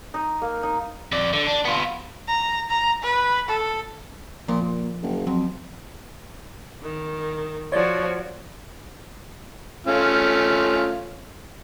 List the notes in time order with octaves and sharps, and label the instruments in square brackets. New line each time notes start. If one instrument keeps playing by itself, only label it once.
[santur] D#4
A#3
D#4
[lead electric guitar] F2 D5
D3
D4
B3 F4
[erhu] A#5
A#5
B4
A4
[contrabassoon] A#2 [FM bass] F3
[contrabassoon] A#2
F#1
[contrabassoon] F2 [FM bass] F#3
[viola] D#3
[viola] F3 F#4 [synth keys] C#5 D5
[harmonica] A3 C#4 F4